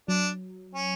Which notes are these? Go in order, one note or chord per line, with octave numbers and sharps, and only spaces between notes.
F#3 D4
C#4